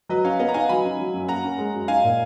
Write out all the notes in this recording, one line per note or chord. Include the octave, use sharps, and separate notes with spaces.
F#3 B4 D#5
C#4 C#5 F5
B3 D#5 F#5
A#5
D#4 F5 G#5
F#3 G#5 B5
C#4
F#3
F#2
A#3 F#5 A#5
C#4
G#3
F#2
D#4 F5 G#5
A#2